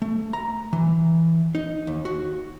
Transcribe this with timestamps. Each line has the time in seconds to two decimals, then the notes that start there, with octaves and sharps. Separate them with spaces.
0.02 A3
0.33 A#5
0.73 E3
1.55 D#4
1.87 D#2
2.05 F#4